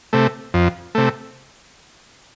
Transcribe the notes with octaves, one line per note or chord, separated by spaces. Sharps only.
C3 A3
F2
C3 A3